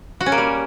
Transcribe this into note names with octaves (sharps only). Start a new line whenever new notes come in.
F#4
C#4
A#3
G3